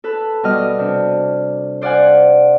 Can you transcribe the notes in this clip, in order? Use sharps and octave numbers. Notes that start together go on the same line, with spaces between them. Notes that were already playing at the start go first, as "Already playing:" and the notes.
A4 B4
B2 G3 D#5 F6
C3 D4
C5 D5 F5 F#5 G#5